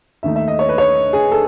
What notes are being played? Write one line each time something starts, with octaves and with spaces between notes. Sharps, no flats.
D#2 D#3 A3 D#4 E5
E5
D#5
C#5
B4
C#5
G#4
A4